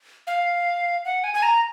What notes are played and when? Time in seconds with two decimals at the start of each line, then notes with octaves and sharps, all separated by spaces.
0.27 F5
1.05 F#5
1.24 G#5
1.34 G#5
1.43 A#5